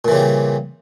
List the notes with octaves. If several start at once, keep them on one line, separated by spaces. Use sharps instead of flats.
A#2 C#3 E3 G3